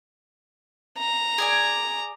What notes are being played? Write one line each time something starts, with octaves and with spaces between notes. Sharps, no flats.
A#5
G#4 D5 G#5